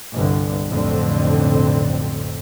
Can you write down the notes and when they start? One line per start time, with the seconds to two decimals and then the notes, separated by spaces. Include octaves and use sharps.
0.13 G1 C2 G2 D3
0.67 B1 F2 A2 D3 C4